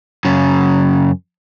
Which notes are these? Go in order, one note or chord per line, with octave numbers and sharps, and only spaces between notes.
F#2 C#3